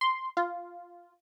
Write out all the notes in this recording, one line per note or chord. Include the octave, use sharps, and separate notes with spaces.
C6
F4